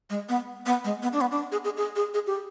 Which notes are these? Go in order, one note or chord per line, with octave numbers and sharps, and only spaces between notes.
G#3
B3
B3
G#3
B3
D4
B3
D4
G#4
G#4
G#4
G#4
G#4
G4